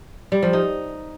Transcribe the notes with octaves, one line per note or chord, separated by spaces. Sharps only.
G3
F3
D#4